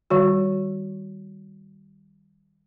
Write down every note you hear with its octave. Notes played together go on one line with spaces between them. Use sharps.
D#3 G3 F#4